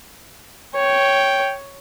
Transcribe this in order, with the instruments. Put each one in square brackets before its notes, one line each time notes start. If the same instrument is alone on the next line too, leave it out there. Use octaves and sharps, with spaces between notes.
[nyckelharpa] C#5 [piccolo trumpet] G5